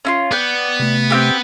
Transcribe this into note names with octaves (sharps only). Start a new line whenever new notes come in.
C#4 E4 F4
B3 D5 F#5 G5
C3 A3
C4 F4 G4